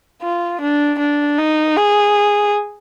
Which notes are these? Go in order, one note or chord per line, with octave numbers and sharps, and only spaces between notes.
F4
D4
D4
D#4
G#4